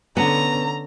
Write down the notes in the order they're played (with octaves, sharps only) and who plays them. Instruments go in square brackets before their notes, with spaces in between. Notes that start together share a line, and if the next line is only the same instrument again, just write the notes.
[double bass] D3 C#4 [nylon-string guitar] B3 [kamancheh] A#5